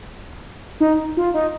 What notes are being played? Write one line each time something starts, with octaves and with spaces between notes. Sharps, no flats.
D#4
F4
D#4